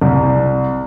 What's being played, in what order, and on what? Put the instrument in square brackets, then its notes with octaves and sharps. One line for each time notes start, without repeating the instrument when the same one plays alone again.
[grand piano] C2